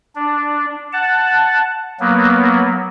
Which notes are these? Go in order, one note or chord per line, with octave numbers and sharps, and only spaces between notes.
D4
F#5 A5
F#3 A#3 B3